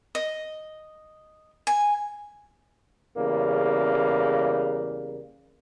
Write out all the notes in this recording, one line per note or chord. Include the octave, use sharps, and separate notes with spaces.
D#5
G#5
E2 C#3 G3 A#3